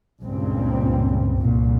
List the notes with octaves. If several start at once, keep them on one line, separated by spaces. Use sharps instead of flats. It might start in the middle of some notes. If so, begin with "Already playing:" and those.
C#2 G2 A#2 C4
C2 A#2